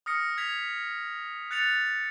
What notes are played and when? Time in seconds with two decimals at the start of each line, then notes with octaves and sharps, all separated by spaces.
0.06 D#6 F6 A#6 C#7
0.38 G#6 B6 F7
1.51 F#6 A6 C#7 F7